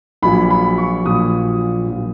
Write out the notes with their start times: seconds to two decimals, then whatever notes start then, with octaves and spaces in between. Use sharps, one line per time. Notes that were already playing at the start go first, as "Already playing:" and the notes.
0.22 A#1 A#2 F#3 B5
0.51 B5
0.78 C#6
1.05 A#1 A#2 F#3 D#6
1.87 A#1 A#2 F#3